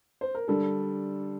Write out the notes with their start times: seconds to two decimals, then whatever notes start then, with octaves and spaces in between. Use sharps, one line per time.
0.21 C5
0.35 A#4
0.48 D3 G3 D4 A4